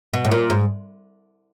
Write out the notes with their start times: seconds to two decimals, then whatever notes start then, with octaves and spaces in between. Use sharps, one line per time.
0.14 B2
0.25 A2
0.31 A#2
0.50 G#2